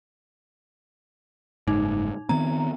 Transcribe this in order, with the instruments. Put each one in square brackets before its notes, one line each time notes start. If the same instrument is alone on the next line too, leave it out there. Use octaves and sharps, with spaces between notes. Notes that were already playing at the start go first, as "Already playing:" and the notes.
[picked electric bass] F#1 G#2 [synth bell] D#4
[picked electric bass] D#3 B3 C4 [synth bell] A#5